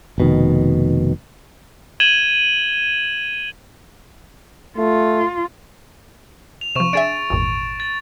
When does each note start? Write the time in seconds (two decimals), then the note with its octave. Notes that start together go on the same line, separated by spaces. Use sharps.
0.18 F1 B2 D#3
2.00 G#6 D#7 E7 F#7 G7
4.78 A3 F4
6.61 F7
6.76 C3 F3 C#6 E7
6.93 D4 G#4 E5 A6 D7
7.30 G#1 E2 A#2
7.80 A6